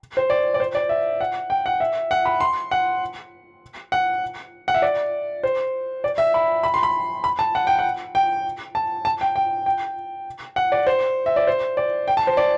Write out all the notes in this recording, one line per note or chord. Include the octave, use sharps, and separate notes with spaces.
C5
D5
D5
C5
D5
E5
F#5
G5
F#5
E5
F#5
B5
C6
F#5
F#5
F#5
E5
D5
C5
D5
E5
B5
B5
C6
B5
B5
A5
F#5
G5
F#5
G5
A5
A5
G5
G5
G5
F#5
D5
C5
E5
D5
C5
D5
G5
A5
C5
D5